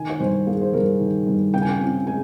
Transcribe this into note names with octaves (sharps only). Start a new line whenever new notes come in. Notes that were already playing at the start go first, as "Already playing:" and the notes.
Already playing: D#3 G#5
C#5
G2 C5
A#3 G#4
C5
G2 A#4
D#3
G2
C#3 G5
G#5
G5
C4 G#5
G#3 G#5